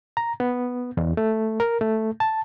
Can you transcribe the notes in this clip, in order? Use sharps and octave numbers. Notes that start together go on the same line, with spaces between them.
A#5
B3
E2
A3
A#4
A3
A5